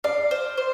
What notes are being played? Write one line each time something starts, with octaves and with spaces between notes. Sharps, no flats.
D5 F5
C5
C5